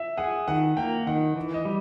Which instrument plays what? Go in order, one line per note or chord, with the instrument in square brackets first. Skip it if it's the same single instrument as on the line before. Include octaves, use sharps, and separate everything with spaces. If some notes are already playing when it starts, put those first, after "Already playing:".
Already playing: [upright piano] E5
[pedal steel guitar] G#4 [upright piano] F#5
[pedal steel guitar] D#3 [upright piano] F#5
[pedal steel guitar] A#3 [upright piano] G5
[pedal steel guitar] D#3 [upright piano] F#5
[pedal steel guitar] E3
[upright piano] D#5
[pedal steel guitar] G3